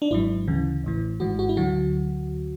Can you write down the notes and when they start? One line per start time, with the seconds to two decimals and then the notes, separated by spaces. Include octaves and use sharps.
0.02 D4
0.11 G#1 G#2 F#3 E4
0.48 D2 C#3 E3
0.83 A1 A2 E3
1.20 G#1 G#2 E3 F#4
1.39 F#4
1.49 E4
1.57 D2 D3 F#3 F#4